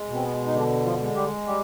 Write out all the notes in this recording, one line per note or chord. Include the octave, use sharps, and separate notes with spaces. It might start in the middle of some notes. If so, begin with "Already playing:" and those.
Already playing: G#3
B2
C4
B3
D#4
D3 D4
F3 F4
G#3
G3 G4
G3 G4